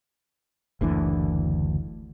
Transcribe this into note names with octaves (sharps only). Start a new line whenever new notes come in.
F#1 D2 D3 E3